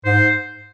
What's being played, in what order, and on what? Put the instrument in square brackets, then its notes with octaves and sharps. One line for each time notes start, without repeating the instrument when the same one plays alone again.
[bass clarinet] G#2 [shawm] C5